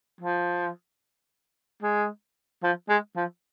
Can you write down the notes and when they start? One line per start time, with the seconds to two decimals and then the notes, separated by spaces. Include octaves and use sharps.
0.21 F3
1.82 G#3
2.63 F3
2.89 G#3
3.16 F3